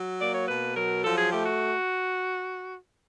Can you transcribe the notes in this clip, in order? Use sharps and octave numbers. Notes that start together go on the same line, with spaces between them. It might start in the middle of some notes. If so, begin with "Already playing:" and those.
Already playing: F#3
A#3 D5
C#5
B2 B4
F#3 A#4
F3 A4
G#4
A3 G4
F#4